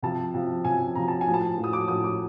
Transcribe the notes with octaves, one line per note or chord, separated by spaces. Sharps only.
C3 F3 A5
C3 F3
C3 F3 G#5
C3 F3 A#5
A5
G#5
A2 F3
A5
A2 F3
D#6
D6
A2 F3 D#6
D6